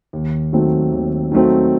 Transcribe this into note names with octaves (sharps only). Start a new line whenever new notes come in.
D#2
D#3 F#3 A3 C4
D#2
D#3 F#3 A3 C4